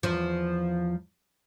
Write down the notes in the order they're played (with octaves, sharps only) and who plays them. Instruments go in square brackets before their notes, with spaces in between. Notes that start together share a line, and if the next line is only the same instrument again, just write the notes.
[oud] E2 F3